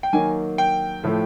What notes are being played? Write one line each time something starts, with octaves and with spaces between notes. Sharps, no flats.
G5
D#3 F#3 A#3 G#5
G5
A2 F3 A3